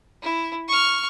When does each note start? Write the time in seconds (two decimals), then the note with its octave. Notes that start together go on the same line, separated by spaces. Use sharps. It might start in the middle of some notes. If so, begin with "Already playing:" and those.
0.23 E4
0.68 C#6 F6